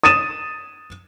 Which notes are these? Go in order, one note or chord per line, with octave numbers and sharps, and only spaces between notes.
D#6 A6 D#7 E7